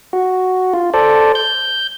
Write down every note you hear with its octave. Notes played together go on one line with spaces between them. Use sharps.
F#4
F4
A4 C5 D5
G6